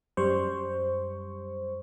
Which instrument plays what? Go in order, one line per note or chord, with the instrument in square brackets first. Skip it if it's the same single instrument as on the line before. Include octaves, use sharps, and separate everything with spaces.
[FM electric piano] F#2 G3 C5 C#6